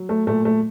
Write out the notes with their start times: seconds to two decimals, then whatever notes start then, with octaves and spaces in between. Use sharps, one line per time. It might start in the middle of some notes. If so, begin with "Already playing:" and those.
Already playing: F#3
0.09 A3
0.27 A#2 A3
0.45 A3